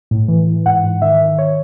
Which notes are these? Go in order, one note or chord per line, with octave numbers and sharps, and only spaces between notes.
A2
E3
E3
G#2 F#5
G#2
D#3 E5
D#3
C#5